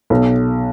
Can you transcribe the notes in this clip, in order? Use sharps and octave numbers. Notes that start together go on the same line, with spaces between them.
B1